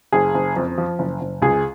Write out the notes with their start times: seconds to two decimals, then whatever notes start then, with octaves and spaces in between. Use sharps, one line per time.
0.12 F#1 G#4
0.34 F#1
0.56 F2
0.78 F3
0.99 F#1
1.21 F#1
1.42 C#2 G#4